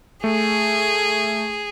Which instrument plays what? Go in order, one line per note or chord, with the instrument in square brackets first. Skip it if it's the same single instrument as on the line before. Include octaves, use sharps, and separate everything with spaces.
[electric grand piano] A3 [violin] G#4